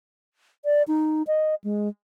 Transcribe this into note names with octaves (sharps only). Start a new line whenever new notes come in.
D5
D#4
D#5
G#3